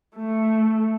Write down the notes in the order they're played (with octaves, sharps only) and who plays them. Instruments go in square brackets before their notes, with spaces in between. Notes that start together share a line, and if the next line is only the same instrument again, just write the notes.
[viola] A3